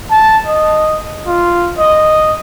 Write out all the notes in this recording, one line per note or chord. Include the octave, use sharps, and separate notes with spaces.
A5
D#5
F4
D#5